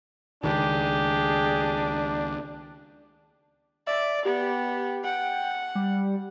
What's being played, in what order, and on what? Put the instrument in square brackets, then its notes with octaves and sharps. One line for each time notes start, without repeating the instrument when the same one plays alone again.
[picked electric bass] C#2 D#3 [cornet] D4 [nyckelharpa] G4 G#4
[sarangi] D5 [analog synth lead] E5
[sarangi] B3 [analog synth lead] G4
[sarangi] F#5 [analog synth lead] G5
[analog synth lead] G3